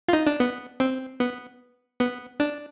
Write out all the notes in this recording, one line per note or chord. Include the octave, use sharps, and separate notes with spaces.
F4
D#4
D4
B3
C4
B3
B3
D4